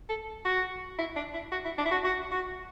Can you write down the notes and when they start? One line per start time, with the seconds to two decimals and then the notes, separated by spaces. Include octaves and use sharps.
0.09 A4
0.45 F#4
0.99 E4
1.16 D4
1.34 E4
1.52 F#4
1.65 E4
1.78 D4
1.85 E4
1.91 F#4
2.05 F#4
2.31 F#4